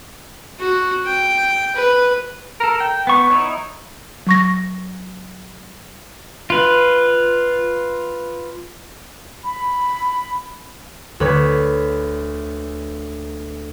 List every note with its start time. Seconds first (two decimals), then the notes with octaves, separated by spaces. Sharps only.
0.59 F#4
1.06 G5
1.75 B4
2.60 A4 A#4
2.80 G5
3.07 B3 C#6
3.30 D#4 E4 C#5
4.27 F#3 C#6 A#6
6.50 F4 B4
9.44 B5
11.20 D2 B4 C#5 B5